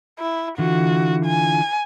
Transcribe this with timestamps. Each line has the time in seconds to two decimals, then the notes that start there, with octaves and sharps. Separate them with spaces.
0.19 E4
0.58 D3 E3 F4 F#4
1.25 G#5